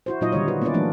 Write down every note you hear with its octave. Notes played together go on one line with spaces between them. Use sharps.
E4 F#4 C5
A#2 F#3 D#4 F4 D#5
D3 D#3 G3 C#5
F#4 B4
A#3 B3 C#4 E4 B4 D5
E3 F#3 A3 A#3 C#4 D4